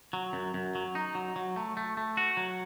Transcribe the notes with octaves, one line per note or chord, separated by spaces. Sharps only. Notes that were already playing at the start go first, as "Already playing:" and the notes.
F#3
F#2
F#2
F#3
D#4
F#3
F#3
A3
A3
A3
F#4
F#3